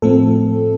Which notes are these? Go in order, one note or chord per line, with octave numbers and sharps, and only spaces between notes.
A2 F3 A3 C4 A4